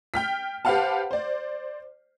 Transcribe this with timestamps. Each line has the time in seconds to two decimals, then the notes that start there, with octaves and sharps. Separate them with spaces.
0.14 G5 F6 B6
0.65 G4 B4 C5 F5 F#5 A5
1.11 C5 D5